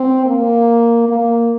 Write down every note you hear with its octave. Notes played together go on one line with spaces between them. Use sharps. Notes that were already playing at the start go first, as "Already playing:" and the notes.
Already playing: C4
A#3
A#3